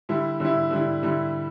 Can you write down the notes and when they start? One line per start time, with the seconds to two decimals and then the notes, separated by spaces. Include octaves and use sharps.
0.09 D3 G3 E4
0.40 D3 G3 E4
0.71 D3 G3 E4
1.03 D3 G3 E4